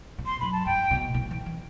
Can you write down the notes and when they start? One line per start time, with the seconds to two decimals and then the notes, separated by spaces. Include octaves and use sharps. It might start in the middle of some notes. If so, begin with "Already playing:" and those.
0.18 B2
0.26 C6
0.40 F#2 B5
0.52 A5
0.66 G2 G5
0.91 B2
1.14 B2
1.31 E3
1.46 E3